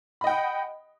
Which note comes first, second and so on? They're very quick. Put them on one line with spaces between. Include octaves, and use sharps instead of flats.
B5 D#5 G5 F#5